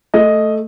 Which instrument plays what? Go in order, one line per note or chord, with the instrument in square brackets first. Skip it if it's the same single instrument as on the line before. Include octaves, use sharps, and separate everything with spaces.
[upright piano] A3 D#5